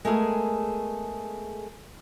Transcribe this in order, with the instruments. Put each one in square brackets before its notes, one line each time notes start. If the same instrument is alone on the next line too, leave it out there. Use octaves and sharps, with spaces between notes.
[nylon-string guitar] G#3 A3 B3 G#4 A#4